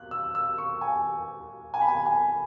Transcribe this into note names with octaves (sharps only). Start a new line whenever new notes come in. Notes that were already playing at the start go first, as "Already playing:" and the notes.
Already playing: F#6
E6
E6
C#6
G#5
G#5
B5
G#5
G#5